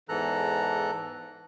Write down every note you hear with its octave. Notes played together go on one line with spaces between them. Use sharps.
E2 G#2 E3 A4 A#5 F#6